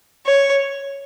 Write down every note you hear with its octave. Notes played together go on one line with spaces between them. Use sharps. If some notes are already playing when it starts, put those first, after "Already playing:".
C#5